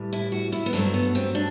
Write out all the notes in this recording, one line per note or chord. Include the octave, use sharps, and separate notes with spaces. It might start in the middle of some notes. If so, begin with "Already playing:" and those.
Already playing: A2 E3 G3
E4
F#4
E4
B3
G2 F#3 A3 C4
B3
C4
D4